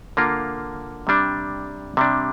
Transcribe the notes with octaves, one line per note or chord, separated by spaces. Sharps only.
D3 A#3 F4 A#4
C3 G3 D4
C3 G3 D4